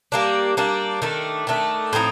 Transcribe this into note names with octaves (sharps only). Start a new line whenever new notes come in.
G3 A#3 D4
G3 A#3 D4
D#3 A3 D4
D#3 A3 D4
A2 F3 C4 D#4